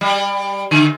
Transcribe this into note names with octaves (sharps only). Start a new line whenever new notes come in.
G3
D3